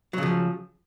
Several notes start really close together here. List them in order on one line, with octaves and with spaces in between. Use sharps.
F#3 C#3 F3